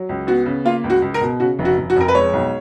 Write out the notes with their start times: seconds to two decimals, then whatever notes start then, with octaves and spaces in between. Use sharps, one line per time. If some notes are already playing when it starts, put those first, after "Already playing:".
Already playing: F#3
0.09 C#2
0.27 B3 F#4
0.46 C#3
0.65 A#3 F4
0.84 C#2
0.90 F#4
1.02 C#2
1.14 A#4
1.21 B2
1.40 C#3 F#4
1.59 F1
1.65 F#4
1.78 F1
1.90 F#4
1.96 F2 A#4
2.08 B4
2.15 G#3 C#5
2.33 B1